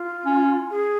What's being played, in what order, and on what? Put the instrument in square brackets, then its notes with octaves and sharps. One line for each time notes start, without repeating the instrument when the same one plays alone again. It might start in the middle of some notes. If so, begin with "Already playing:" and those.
Already playing: [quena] F4
[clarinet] C#4
[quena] G#4